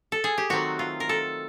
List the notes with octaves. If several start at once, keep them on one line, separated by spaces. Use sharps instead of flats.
A4
G#4
G4
D#3 F#3 A3 C4 F#4
F4
A#4
A4